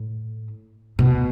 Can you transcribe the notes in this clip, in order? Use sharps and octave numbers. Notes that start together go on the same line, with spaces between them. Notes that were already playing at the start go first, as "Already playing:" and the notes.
Already playing: A2
B2